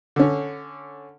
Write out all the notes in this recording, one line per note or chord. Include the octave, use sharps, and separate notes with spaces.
D3 C#4